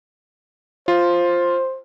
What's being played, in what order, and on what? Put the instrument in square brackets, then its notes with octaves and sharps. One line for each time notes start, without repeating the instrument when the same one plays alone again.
[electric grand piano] F4 [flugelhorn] C5